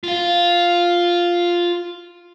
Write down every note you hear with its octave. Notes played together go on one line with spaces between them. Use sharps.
F4 F5